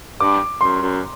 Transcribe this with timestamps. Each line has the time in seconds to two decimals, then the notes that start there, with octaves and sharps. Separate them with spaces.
0.20 G2 D6
0.61 F#2 C6
0.82 F#2